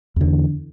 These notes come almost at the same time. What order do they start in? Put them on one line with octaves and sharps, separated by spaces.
E2 D3 E3